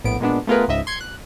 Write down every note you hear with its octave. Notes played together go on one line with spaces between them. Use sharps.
A#1 A2 B3 D7
A#2 G#3 B3 D4
A3 B3 F4 G#4 A#4 B4
C#2 G#2 D#5 E5
C6 G#6 C#7
F#6